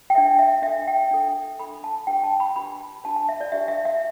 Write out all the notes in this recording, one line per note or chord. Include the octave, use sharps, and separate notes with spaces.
G5
D4 A4 E5
E5
D4 A4 E5
G5
D4 A4
D4 A4 B5
A5
D4 G4 B4 G5
A5
B5
D4 G4 B4 B5
D4 G4 B4 A5
A5
E5
D5
D4 G4 B4 E5
E5
E5